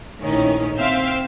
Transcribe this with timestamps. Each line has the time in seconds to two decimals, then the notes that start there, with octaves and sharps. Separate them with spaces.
0.21 A#1 A2 D#3 C#4
0.78 C4 C5 E5 F5 G5